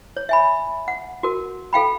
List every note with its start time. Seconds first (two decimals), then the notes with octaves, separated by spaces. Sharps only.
0.17 C#5
0.29 E5 G#5 B5
0.88 F#5
1.23 F#4 A#4
1.73 A4 F5 G5 B5